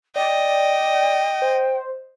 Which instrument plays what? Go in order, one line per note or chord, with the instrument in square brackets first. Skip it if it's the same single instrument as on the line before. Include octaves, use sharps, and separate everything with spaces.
[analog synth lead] D5 [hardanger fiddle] D#5 [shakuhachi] G5
[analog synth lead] C5